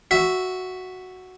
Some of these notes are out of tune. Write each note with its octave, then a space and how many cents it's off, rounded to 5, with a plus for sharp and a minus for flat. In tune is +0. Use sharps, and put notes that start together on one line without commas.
F#4 +0 E5 +0